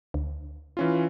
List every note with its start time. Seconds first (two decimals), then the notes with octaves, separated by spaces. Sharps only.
0.14 D2
0.77 E3 C#4 F4